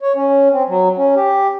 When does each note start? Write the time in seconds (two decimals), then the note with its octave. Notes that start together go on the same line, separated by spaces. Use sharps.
0.01 C#5
0.16 C#4
0.53 C4
0.69 F#3
0.97 C#4
1.16 G4